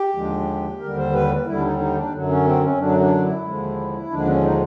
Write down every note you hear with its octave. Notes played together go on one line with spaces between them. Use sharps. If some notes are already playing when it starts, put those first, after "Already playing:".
Already playing: G4
D#2 D3 F3 G#3
D#2 D3 G3 A#4
C5
B4
D#2 D3 G3 E4
D4
D#4
D#4
D4
F#2 D3 F#3
C#4
C4
C#4
F#2 D3 F#3 D4
D4
E4
D#2 D3 F3 G#3
D#2 D3 F3 G#3 D4
C#4
D#4